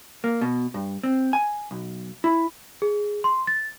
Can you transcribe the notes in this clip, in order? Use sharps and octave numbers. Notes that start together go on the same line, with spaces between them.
A#3
B2
G2
C4
G#5
B1
E4
G#4
C6
A6